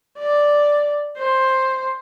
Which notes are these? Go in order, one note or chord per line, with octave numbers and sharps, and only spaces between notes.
D5
C5